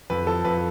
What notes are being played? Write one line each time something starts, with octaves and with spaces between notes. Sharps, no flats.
F2 B4
F3 A4
F2 B4